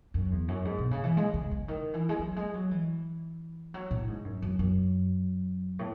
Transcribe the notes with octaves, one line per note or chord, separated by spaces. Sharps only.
F#2
E2
F#2
G#2
B2
C#3
E3
G#3
C#3
C#3
D#3
E3
G#3
F#3
G#3
F#3
E3
F#3
A2
G#2
F#2
F#2
F#2
A2